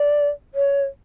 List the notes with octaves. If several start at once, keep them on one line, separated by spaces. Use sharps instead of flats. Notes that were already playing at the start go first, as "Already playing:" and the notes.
Already playing: D5
C#5